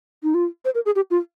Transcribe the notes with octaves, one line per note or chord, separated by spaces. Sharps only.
D#4
F4
C5
A#4
G#4
G4
F4